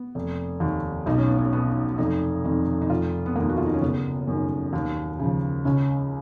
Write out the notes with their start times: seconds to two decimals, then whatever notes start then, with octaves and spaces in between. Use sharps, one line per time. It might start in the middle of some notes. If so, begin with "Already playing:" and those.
Already playing: B3
0.15 F1
0.60 D#2 D#3
1.06 B1 D#4
1.18 C#4
1.28 B3
1.38 C#4
1.52 B2 B3
1.98 F1 D#4
2.44 F2 D#3
2.81 D#4
2.90 F1 F4
3.26 B3
3.36 D#2 D#3 A#3
3.49 F#4
3.58 F4
3.66 D#4
3.74 C#4
3.81 F#1 B3
4.27 F#2 D#3
4.73 D#2
5.19 C#3 F3
5.65 C#2 C#4